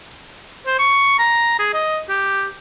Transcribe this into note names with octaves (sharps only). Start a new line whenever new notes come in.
C5
C#6
A#5
G#4
D#5
G4